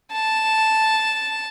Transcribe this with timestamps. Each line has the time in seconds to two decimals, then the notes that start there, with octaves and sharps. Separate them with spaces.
0.12 A5